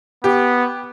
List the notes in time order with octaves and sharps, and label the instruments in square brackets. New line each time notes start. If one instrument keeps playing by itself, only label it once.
[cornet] B3 [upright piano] G4